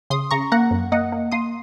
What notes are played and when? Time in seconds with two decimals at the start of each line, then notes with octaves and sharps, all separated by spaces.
0.10 C#3 C6 D#6
0.31 C#3 A#5 C#6
0.52 A#3 F#5 A#5
0.71 F#2
0.92 A#3 D#5 F#5
1.12 A#3
1.32 A#3 C6 D#6